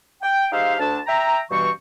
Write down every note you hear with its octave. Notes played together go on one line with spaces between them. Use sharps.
G5
G#3 D#4 G4 C5 E5 F5
D2 D4 A5
E5 G5 A#5
G2 B2 E3 G3 C4 C#6